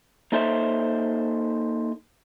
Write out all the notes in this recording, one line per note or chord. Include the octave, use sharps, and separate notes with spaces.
A#3 D#4 A4 C5 C#5 E5